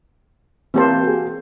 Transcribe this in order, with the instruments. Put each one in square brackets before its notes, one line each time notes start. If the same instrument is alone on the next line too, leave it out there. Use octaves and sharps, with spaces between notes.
[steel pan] E3 A#3 C5 [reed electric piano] C4 G4 A5
[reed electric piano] F#4 G#4